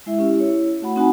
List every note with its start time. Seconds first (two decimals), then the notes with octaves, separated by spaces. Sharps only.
0.06 G#3 E4 E5
0.18 C#4 E4 G4
0.40 E4 C#5
0.82 A3 F#4 F#5 B5
0.96 C4 D#4 F#4 F#5 G#5 B5